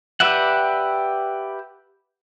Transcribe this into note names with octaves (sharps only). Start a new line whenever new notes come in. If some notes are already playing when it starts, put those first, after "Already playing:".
G4 B4 D5 E5 F#5